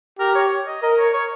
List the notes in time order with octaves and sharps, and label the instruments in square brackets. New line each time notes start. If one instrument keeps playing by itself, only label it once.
[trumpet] G4 [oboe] A#4
[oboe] C#5
D#5
[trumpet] A#4 [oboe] D#5
[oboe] C#5
C#5